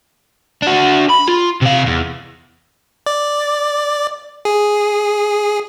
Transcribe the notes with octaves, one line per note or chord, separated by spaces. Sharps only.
D4 F#4
B5
F4
C3 F5
E2
D5
G#4